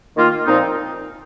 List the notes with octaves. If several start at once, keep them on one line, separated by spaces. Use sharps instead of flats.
D#3 A#3 F4
A#2 F3 C4 D#4